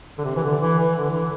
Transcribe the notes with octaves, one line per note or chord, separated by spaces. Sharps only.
D3
C3
E3
D3
E3
E3
D3
E3